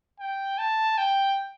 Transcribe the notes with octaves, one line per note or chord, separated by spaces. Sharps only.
G5
A5
G5